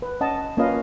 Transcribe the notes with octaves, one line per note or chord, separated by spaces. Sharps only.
B4
C#4 D#5 F#5 A5
A#3 C#4 F4 B4 D#5 F5